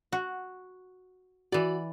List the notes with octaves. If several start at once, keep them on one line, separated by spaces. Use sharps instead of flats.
F#4
E3 F#4 D5